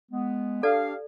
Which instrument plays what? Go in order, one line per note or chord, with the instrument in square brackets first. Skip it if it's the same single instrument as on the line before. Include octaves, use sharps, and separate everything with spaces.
[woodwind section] G#3 B3
[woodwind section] D4 G4 F5 [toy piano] A4 D5 A5